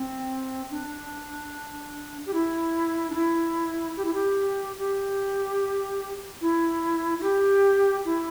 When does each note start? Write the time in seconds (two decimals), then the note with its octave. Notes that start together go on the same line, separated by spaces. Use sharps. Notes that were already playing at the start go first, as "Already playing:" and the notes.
Already playing: C4
0.71 D4
2.26 G4
2.34 E4
3.10 D4
3.15 E4
3.97 G4
4.05 E4
4.13 G4
4.79 G4
6.41 E4
7.19 E4
7.23 G4
8.05 E4